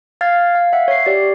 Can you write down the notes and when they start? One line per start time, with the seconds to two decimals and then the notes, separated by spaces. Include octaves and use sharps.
0.21 F5 F6 G#6 A6
0.55 F5
0.73 E5 F#5
0.88 C#5 C7
1.06 G4 C#5 D5